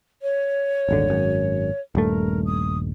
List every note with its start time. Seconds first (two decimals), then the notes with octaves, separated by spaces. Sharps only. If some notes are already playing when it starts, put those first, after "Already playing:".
0.21 C#5
0.89 D#1 G#1 D3
1.10 G#1 F#2
1.95 D#1 G2 A3 A#4
2.46 D#6